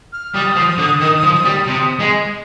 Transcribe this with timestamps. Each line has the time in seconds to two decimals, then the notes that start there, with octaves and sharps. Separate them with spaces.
0.13 F6
0.34 G3 D#6
0.56 F3
0.78 D3
1.01 D#3
1.23 F3
1.45 G3
1.67 C3
2.00 G#3